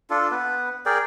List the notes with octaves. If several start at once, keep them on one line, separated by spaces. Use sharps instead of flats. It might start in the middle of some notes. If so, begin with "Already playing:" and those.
D4 F4 A4
B3 B4
G#4 A#4 D5 G5